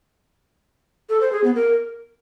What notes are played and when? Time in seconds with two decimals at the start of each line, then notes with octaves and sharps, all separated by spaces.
1.10 A4
1.21 C5
1.32 G#4
1.44 B3
1.55 A#4